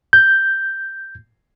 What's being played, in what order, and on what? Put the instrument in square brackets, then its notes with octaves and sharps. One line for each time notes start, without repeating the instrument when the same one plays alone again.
[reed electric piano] G6